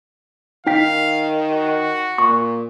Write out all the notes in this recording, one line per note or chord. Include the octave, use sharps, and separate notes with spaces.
D#3 D#4 F5 G5 B6
F#4
A#2 C#6